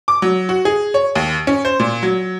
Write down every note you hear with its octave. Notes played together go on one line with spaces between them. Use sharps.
D6
F#3
F#4
G#4
C#5
D#2
C#4
C5
A#2
F#3